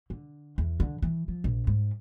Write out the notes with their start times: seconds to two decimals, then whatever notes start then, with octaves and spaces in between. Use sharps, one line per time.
0.10 D3
0.58 E2
0.80 D3
1.02 E3
1.28 F3
1.44 A#1
1.67 G#2